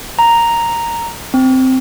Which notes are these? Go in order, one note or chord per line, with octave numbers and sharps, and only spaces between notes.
A#5
C4